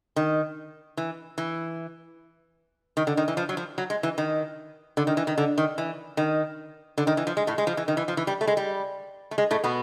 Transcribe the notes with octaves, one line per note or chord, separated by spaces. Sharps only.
D#3
E3
E3
D#3
D3
D#3
E3
F3
F#3
F3
F#3
G#3
E3
D#3
D3
D#3
E3
D#3
D3
D#3
E3
D#3
D3
D#3
E3
F3
G#3
A2 A3
G#3
F3
E3
D#3
E3
F3
E3
G3
A3
G#3
G3
A3
G#3
A2 A3
B2 B3